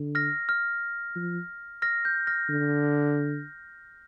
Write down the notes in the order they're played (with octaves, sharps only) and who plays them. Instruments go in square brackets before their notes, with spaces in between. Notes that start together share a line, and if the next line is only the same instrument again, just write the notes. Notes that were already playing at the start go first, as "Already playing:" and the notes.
Already playing: [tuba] D3
[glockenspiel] F6 A#6
F6
[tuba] F3
[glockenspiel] F6 A#6
G6
F6 A#6
[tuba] D3